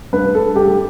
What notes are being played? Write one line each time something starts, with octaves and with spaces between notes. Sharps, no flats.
G2 B4
A3 A4
G2 G4